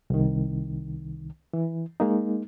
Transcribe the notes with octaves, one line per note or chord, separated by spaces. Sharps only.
C2 D#3
E3
G#3 A#3 D#4